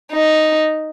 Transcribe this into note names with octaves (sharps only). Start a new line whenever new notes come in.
D#4